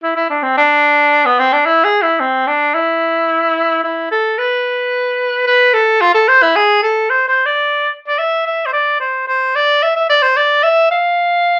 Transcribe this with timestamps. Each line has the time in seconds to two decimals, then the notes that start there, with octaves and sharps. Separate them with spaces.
0.03 E4
0.16 E4
0.30 D4
0.43 C4
0.57 D4
1.25 B3
1.39 C4
1.53 D4
1.66 E4
1.84 G#4
2.02 E4
2.20 C4
2.47 D4
2.75 E4
3.84 E4
4.11 A4
4.38 B4
5.47 B4
5.74 A4
6.01 F4
6.14 A4
6.28 C5
6.43 E4
6.56 G#4
6.83 A4
7.10 C5
7.29 C5
7.46 D5
8.07 D5
8.18 E5
8.46 E5
8.66 C5
8.73 D5
9.00 C5
9.28 C5
9.55 D5
9.83 E5
9.96 E5
10.09 D5
10.22 C5
10.37 D5
10.63 E5
10.91 F5